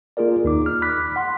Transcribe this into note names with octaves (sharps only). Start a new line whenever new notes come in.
A#3 F4 G#4 A#4 D5
D#2 D#4 D6
F6
B5 D6 F#6 B6
F#5 C6